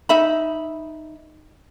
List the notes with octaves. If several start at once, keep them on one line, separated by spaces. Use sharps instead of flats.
D#4 E5 B5